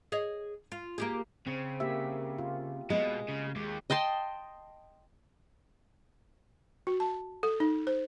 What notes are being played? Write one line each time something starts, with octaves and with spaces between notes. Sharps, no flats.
G#4 C#5 D#5
F4
A#3 G4 G#4
C#3 C4
A#3 G4 E5
F4
B2 G#3
C#3
D#2 G#3 G4
D#5 G5 A5 C6
F#4
A5
A4
D#4
C5